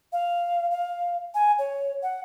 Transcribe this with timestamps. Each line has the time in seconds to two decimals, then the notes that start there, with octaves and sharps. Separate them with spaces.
0.12 F5
0.71 F5
1.34 G#5
1.58 C#5
2.03 F#5